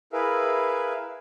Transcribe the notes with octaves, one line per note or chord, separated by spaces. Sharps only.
E4 G#4 A#4 B4 E5 F5